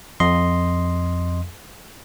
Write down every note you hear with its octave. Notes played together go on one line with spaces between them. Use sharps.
F2 D#5 C6